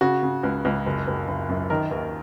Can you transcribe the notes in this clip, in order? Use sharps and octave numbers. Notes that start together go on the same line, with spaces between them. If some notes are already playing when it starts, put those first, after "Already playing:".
C#3 F#4
C#3
C#2
C#2
F#1
F#1
F#1
F#2
D#3 A#4
D#2